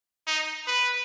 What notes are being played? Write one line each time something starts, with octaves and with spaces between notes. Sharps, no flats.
D#4
B4